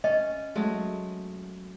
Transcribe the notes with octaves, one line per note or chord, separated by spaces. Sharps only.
C#4 D#5
F#3 G#3 A3